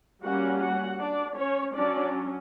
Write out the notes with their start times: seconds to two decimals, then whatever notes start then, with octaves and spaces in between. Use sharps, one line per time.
0.23 G3 A#3 C#4 F#4 F#5
0.60 F#4 F#5
0.99 D4 D5
1.36 C#4 C#5
1.74 F#3 C#4 D4 D5